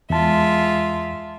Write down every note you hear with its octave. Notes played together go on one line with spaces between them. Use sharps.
E2 G#3 F4 E5 A5